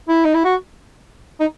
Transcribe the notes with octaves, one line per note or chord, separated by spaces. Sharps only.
E4
D#4
E4
F#4
D#4